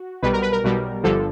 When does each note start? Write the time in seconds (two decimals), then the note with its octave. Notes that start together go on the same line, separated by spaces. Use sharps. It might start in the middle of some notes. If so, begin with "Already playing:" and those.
Already playing: F#4
0.23 B1 B2 G3 B4
0.33 A#4
0.42 B4
0.52 A#4
0.64 B1 B2 G3
1.03 G1 G2 D3 F3 A4